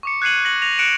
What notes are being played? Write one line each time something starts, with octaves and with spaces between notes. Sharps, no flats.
C#6 D6 C#7
F#6 G#6 C7 C#7 D#7 F#7
A#6 C#7 F#7
A#6 F7
F#6 C#7 D7 E7